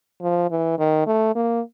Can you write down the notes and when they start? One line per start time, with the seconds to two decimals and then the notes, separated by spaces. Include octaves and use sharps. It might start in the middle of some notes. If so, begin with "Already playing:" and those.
0.22 F3
0.50 E3
0.78 D#3
1.06 A3
1.35 A#3